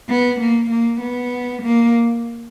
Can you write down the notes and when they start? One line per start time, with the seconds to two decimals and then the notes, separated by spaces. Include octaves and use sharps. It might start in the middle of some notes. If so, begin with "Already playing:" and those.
0.09 B3
0.40 A#3
0.70 A#3
1.01 B3
1.62 A#3